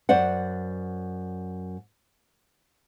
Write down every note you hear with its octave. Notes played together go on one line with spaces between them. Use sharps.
F#2 C5 D5 F#5